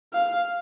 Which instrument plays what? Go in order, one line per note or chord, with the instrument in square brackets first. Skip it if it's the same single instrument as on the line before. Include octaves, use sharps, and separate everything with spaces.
[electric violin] F5